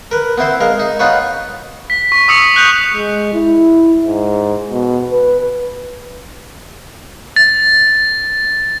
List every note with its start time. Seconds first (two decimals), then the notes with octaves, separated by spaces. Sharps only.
0.11 A#4 B4
0.38 B3 C4 E4 C5
0.60 G#3 A#4 F5
0.79 D#4
0.99 B3 D#4 F4 B4 C#5
1.90 B6
2.12 C#6
2.28 C#6 D#6 E6 C#7
2.56 F#6 G6 F7
2.94 G#3
3.34 E4
4.03 G#2
4.71 B2
5.12 B4
7.36 A6